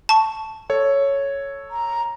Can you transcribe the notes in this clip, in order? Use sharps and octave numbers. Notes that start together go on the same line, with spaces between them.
A5 C#6
A4 C#5
A#5